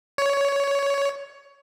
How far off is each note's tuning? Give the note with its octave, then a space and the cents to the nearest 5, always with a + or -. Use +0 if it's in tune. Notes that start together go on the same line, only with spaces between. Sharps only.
C#5 +15